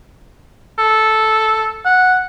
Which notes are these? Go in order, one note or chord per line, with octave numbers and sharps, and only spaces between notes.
A4
F#5